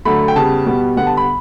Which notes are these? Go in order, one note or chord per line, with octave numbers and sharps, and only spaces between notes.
D3 F#3 A3 B5
G5
C#3 G3 B3 A5
B2 G3 B3
D3 G3 B3 F#5
A5
B5